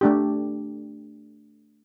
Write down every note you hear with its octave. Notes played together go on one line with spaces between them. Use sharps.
A3 D4 G4